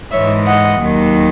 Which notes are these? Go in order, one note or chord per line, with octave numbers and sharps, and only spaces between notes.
G#2 E3 G#3 C#5 E5
D#5 F#5
D#2 D#3 F#3